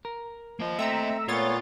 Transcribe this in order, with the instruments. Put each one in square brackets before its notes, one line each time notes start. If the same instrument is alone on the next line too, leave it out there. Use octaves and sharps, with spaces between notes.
[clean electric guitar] A#4
[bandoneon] F3 [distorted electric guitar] A#3 D#5
[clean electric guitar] A3 [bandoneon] C4 [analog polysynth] E5 A#5 E6
[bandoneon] A#2 B3 [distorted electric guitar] F4 [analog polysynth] C#5 A6